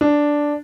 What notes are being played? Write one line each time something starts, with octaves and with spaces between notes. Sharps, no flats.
D4